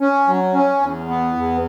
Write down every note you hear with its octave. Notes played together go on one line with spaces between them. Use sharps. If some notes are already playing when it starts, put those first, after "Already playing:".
C#4
F#3
C#4
E2
B3
E2